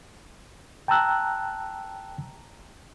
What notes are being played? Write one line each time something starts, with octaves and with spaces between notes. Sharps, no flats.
G5 A5 A#5 E6 F#6